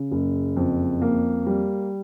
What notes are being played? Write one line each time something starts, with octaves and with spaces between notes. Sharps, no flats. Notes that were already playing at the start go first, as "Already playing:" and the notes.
Already playing: C#3
F#1
F2
A#3
G3